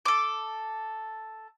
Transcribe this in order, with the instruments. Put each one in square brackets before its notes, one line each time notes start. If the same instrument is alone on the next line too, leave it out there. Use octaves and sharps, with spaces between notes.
[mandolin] A4 D6